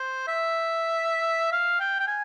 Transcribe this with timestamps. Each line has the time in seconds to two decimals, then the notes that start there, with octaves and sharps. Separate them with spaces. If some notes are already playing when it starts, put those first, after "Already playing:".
Already playing: C5
0.27 E5
1.52 F5
1.80 G5
2.00 G5
2.07 G#5